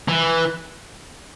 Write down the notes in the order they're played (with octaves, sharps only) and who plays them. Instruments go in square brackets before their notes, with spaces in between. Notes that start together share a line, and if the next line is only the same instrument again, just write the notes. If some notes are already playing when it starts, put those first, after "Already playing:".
[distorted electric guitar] E3